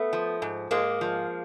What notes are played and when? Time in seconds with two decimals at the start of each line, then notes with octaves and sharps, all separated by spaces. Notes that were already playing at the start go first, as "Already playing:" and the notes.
Already playing: A3 B3
0.13 F3
0.42 G#2
0.71 G#2 G#3 A#3
1.01 F3